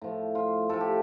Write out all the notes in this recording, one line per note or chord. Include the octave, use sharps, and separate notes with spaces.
A2 F3
F4
A2 F3 A4
G4